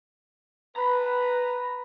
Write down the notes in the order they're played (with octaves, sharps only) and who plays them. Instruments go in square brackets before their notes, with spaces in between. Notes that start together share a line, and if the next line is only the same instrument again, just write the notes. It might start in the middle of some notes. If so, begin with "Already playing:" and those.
[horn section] B4 [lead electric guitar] A#5 B5